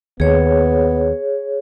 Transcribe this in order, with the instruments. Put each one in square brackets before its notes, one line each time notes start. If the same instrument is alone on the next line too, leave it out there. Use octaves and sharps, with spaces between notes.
[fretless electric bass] D#2 [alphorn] B3 [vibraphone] G#4 C#5